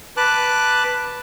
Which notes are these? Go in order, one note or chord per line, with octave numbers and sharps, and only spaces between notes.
B4 A5 D6 F#6